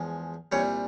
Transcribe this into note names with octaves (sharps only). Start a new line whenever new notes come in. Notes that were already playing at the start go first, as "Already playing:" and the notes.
Already playing: E2 F3 G#3
C2 A#2 G3 C#5